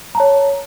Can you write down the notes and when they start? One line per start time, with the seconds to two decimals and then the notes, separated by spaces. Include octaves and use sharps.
0.15 A#5
0.17 A5
0.20 C#5